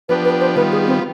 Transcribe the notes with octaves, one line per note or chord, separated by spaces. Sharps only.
F3 B3 D4 G4 B4
B4
C5
D#3 G3 B3 F4 B4
G#4
C4